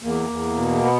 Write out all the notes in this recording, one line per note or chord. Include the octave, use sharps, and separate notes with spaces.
E2 A#3
E2
B2
B3